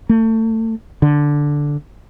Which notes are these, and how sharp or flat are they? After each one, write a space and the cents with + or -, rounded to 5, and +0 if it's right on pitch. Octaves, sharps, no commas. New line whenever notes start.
A3 +30
D3 -5